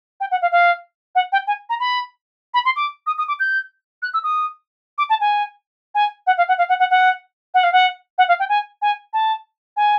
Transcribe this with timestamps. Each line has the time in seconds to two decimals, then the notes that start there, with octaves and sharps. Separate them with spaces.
0.20 G5
0.31 F#5
0.42 F5
0.52 F5
1.15 F#5
1.32 G5
1.47 G#5
1.69 A#5
1.80 B5
2.54 B5
2.65 C6
2.76 D6
3.07 D#6
3.18 D#6
3.28 D6
3.40 G6
4.02 F#6
4.14 E6
4.24 D#6
4.98 D6
5.10 A5
5.21 G#5
5.95 G#5
6.27 F#5
6.38 F5
6.48 F#5
6.58 F5
6.69 F#5
6.79 F#5
6.90 F#5
7.54 F#5
7.63 F5
7.72 F#5
8.18 F#5
8.28 F5
8.39 G5
8.49 G#5
8.82 G#5
9.13 A5
9.77 G#5